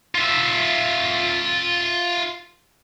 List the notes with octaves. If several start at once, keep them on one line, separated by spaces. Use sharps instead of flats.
F4 E5